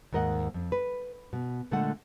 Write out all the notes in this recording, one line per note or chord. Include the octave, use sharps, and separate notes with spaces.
D#2 G#2 A#4 D#5 F#5
F2
B4
B2
A#2 D3 G#3 A3 A4 F#5